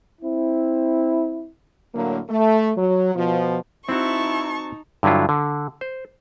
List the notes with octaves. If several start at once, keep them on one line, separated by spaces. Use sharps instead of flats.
C4 E4
A2 D3 F#3 A#3
A3
F#3
B2 F3
C4 D#4 E4 F#4 A5 C#6
G2 D3 F#3 E4 F4
D3
C5